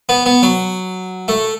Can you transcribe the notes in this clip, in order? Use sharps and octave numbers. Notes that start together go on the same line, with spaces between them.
B3
B3
F#3
A3